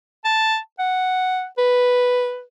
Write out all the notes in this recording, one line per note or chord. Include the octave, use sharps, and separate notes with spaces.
A5
F#5
B4